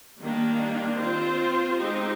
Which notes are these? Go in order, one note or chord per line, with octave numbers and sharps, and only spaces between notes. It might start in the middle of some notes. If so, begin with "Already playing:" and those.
D#3 G3 A#3 D4
C4 F4 C5
G#3 C4 D#4 G4